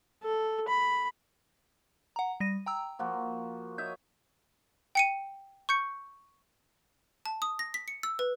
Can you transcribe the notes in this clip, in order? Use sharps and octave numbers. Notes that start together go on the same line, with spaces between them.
A4
B5
F#5 A#5
G3 A#6 D#7
G5 A#5 E6
F3 A#3 F#4
C#5 D#5 E5 G6
G5 C#7 D#7
C#6 G6 C#7
A5
D#6
A#6
B6
C#7
E6
B4